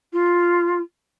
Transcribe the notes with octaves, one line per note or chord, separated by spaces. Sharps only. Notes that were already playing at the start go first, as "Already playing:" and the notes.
F4